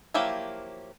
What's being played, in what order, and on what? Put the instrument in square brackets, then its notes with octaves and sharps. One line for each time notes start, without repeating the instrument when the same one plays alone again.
[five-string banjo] F3 F#3 A#3 E4 G4